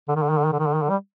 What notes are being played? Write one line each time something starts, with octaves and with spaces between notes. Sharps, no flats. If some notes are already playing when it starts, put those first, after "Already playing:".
D3
D#3
D3
D#3
D3
D#3
D3
D#3
D3
D#3
D3
G3